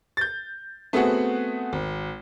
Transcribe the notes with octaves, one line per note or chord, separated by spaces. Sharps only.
G6 A6
A3 B3 C4 F#4 G#4 F#5
G#1